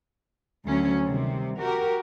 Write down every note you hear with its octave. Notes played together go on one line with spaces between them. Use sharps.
D2 F#3 C#4
C3 D#3 G3
F#4 G4 A#4